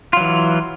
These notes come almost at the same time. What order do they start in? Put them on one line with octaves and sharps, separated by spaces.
F4 F#3 E3